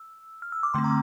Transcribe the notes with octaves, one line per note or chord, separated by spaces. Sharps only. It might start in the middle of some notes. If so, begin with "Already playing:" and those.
Already playing: E6
F6
E6
D6
D3 A3 C4 C6
A#5